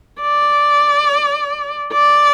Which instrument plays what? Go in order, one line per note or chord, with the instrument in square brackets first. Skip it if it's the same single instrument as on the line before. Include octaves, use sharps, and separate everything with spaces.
[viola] D5
D5